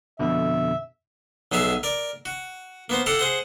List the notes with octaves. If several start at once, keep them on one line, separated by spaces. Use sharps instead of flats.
F2 B2 D3 E5
B1 F#3 G#4 E5 F5
A#4 D5
F#4
A#3 B3 C5
G4 A4 F5 F#5
G#4 C5 F#5